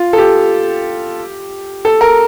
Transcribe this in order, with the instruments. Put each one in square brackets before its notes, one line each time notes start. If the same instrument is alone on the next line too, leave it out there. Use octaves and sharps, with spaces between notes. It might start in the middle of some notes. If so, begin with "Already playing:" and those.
Already playing: [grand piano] F4
A4
G4
A4
A#4